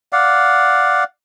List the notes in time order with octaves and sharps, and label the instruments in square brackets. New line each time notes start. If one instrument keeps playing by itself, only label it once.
[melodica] D5 F5 F#5